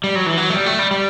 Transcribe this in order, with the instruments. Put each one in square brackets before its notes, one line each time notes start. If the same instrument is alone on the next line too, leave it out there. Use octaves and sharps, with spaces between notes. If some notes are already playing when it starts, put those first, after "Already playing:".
[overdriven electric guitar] G3
F#3
E3
F#3
A3
G3
A3
G3
G3